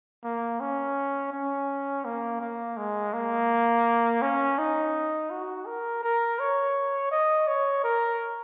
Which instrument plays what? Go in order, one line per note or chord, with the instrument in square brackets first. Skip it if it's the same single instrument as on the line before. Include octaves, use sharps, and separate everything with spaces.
[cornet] A#3
C#4
C#4
A#3
A#3
G#3
A#3
C#4
D#4
F#4
A#4
A#4
C#5
D#5
C#5
A#4